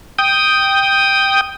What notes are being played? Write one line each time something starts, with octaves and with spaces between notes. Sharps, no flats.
G5 D#6